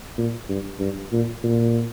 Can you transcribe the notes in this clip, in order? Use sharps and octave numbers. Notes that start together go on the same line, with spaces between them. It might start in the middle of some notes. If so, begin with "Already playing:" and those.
A#2
G2
G2
A#2
A#2